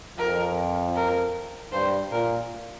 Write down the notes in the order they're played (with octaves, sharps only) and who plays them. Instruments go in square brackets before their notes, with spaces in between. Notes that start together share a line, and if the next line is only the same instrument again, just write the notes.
[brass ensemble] F2 [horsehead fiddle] A#4
[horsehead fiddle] A#4
[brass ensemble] G2 [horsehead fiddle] C5
[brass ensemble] A#2 [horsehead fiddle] A#4